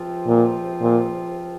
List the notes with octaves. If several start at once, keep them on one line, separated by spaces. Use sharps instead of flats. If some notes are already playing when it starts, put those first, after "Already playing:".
Already playing: C#2 C3 F3 C4 F4
A#2
A#2